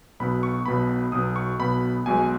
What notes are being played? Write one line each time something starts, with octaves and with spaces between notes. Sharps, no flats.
B1 B2 B3 B5
C#6
B1 B2 B3 B5
B1 B2 B3 D#6
C#6
B1 B2 B3 B5
B1 B2 G#3 G#5